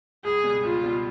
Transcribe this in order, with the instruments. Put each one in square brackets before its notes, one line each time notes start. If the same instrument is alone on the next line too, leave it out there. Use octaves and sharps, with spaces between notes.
[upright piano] C#2 [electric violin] G#4
[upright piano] B2 G3
[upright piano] C#2 [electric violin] F4
[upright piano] B2 G3